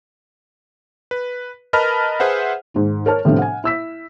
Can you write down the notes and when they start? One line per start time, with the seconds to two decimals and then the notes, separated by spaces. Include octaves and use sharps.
1.11 B4
1.73 A#4 B4 D#5 A5 B5 F6
2.20 G#4 B4 C5 E5 F#5
2.74 G#2 D#3
3.06 A#4 C#5 A5 F6
3.25 A2 C3 F3 B3 C4 D4
3.38 F#5 G#5
3.64 E4 E6 B6